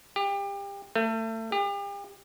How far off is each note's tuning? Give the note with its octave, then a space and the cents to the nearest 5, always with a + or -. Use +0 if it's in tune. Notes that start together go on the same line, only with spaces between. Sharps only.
G4 +30
A3 +30
G4 +40